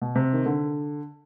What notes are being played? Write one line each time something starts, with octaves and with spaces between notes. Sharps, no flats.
B2
C3
D#3
D3